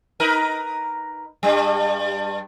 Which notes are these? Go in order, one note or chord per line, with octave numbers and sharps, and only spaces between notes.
D#4 A#4 B4
G2 G3